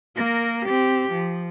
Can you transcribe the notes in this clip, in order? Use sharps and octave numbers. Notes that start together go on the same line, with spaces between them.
A#3 A#4
C4 G4
F3